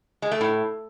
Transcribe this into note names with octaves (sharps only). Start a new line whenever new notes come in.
G#3
A3
A2